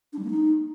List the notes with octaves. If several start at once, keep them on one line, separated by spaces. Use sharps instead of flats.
D4
G3
A#3
D#4